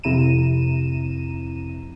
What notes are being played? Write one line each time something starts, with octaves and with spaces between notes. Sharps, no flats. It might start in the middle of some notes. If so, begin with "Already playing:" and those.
F2 C3 E4 A#5 D#7 E7